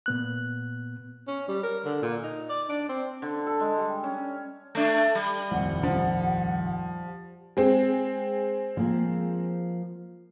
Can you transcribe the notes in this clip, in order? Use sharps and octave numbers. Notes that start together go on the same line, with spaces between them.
A#2 B3 F#6
C#4
G3
A#4
D3
A#2
D#4
D5
D4
C4
D3
A4
G#3
G3
C#4
A3 D4
G3
D#1 C2 F2 F#5
F3
G#3 C4
F3 A#3